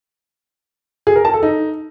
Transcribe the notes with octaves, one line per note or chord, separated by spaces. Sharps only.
G#4
A#4
A5
A4
D#4